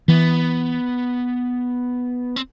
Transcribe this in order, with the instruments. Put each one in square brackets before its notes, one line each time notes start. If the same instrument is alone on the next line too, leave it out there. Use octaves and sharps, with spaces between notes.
[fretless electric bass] E3 [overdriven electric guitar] B3
[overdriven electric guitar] C4